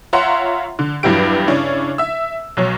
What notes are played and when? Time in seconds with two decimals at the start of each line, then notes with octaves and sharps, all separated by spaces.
0.13 F4 C#5 E5 F#5 A#5 C6
0.79 D3
1.03 E2 G2 F#3 E4 G4 D7
1.47 C#3 C#4 D4 E4
1.98 E5 E6
2.57 B1 F#3 C#5